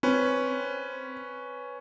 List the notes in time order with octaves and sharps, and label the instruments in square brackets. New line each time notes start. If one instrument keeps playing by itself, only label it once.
[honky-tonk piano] C4 [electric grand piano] C#4 B4